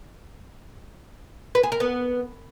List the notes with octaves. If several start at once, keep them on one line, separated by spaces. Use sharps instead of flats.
B4
G#4
A#4
B3